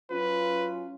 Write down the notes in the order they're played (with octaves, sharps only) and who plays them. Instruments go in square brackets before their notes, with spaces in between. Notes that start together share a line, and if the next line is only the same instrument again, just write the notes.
[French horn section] F#3 C#4 F4 [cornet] B4